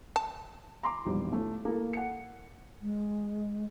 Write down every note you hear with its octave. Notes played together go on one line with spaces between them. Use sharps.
A5
A#5 C6 D6
E1 A#1 D#3 G3
A2 A3
A#3 E4 A4
F#5 C#7
G#3